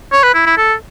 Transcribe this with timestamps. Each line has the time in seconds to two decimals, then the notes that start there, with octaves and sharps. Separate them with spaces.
0.12 C#5
0.23 B4
0.34 E4
0.46 E4
0.58 A4